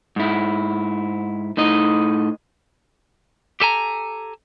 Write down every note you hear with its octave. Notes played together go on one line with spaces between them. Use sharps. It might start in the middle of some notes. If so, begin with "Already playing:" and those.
G#2 E4
A2 D#4 D#5
G4 A4 G#5 A#5